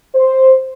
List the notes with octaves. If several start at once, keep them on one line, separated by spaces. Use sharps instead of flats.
C5